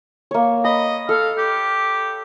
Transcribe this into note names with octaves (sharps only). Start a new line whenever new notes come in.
A#3 C#5
D#5 B5
A4 F5
G4